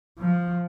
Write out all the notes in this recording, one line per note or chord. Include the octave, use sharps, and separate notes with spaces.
F3